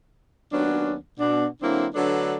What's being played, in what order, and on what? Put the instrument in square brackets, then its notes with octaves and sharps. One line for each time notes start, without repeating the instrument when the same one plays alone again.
[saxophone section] D#2 F#3 B3 C#4 D4
B2 D4
D3 F#3 A#3 C4 D4 E4
D3 F#3 A3 D4 A4 B4